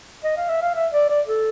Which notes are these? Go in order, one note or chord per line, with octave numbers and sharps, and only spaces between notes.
D#5
F5
E5
F5
E5
D5
D5
A4